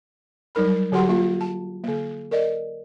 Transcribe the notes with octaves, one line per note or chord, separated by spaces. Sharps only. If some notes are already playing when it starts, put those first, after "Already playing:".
F#3 G3 D#4 A#4 B5
D3 F#3 F#4 G4 F#5 C6
A#3 F4
A5
D3 A#3
A#4 D5 D#5